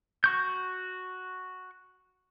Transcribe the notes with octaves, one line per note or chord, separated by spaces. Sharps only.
F#4 C#6 G6